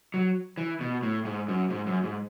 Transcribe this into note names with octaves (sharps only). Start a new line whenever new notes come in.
F#3
E3
B2
A2
G#2
F#2
G#2
F#2
G#2